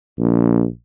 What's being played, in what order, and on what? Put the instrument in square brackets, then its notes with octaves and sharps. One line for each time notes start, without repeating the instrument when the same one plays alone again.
[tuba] A#1